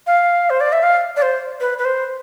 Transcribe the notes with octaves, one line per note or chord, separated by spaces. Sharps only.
F5
C5
D5
E5
F5
D5
C5
B4
B4
C5